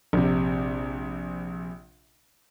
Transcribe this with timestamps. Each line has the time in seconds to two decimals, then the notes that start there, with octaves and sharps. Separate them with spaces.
0.13 A#1 C3